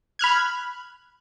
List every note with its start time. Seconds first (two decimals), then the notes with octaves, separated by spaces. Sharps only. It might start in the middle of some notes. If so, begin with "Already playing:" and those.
0.19 B5 F6 F#6 G#6